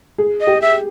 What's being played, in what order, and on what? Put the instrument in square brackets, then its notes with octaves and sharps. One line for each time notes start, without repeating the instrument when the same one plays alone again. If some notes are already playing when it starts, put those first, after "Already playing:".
[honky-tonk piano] G#4
[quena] D#5
[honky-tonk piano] G4
[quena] E5